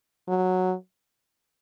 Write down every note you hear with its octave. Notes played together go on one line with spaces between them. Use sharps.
F#3